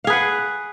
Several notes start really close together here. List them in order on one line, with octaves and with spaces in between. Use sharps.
F5 G#4 B4 F#5